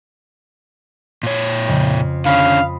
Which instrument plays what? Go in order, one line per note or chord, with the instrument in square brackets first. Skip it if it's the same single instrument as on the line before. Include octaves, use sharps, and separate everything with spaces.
[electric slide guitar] A#2 C#5
[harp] F2 C#3
[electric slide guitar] D3 C#4 [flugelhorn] F5 [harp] B5 D#6